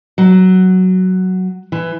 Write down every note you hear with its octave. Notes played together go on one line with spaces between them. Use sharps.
F#3
E3